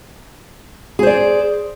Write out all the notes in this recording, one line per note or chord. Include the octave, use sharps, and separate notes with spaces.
G#4 C5 D5